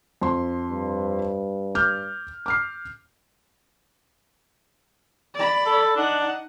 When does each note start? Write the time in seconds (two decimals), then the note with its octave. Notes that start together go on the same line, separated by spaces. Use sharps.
0.22 F2 C6
0.70 G2
1.75 D6 F6 G6
2.46 D6 F6 C7
5.35 D5 B5
5.66 A4
5.96 D4 D#4 F#5